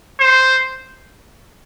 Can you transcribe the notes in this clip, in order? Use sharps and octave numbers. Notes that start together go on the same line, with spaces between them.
C5